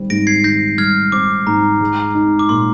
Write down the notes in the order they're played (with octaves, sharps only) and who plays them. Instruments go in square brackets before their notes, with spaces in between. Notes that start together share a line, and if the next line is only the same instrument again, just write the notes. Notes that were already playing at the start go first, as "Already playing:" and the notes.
Already playing: [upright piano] D#3 G3 C4
[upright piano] G#2 [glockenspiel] A#6 D7
[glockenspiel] G#6 C7
[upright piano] D#3 [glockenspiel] G6 A#6
[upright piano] G3 [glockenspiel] F6 G#6
[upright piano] C4 [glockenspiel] D6
[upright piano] G#2 [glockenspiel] A#5
[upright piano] G#3
D#4
[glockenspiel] D6
[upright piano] A#2 [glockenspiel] C6